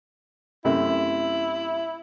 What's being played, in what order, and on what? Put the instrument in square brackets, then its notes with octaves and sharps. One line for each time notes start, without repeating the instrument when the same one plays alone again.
[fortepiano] F#2 C3 A3 [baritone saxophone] E4